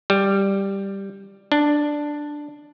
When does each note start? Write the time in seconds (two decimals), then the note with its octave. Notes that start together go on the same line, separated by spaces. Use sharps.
0.10 G3
1.52 D4